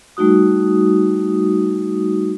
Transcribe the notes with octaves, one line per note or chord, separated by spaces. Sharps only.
G3 A3 D#4 F#4 D#6